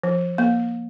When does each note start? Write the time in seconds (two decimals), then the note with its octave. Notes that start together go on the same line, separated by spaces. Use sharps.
0.03 F3
0.38 A#3